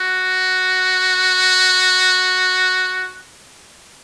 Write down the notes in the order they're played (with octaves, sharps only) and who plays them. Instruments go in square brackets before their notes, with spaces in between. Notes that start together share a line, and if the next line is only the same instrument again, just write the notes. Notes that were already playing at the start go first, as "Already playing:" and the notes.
Already playing: [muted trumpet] F#4